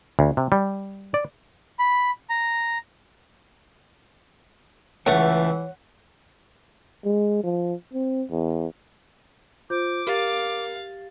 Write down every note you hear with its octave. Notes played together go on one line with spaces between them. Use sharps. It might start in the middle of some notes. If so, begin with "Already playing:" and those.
D2
C3
G3
D5
B5
A#5
C#2 E3 A3 C#5 F#5
G#3
F3
C4
E2
F4 C5 D6 G6
G4 A#4 F5 A6